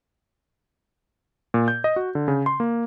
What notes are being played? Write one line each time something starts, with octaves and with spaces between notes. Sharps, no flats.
A#2
G6
D#5
F#4
D3
C#3
C6
A#3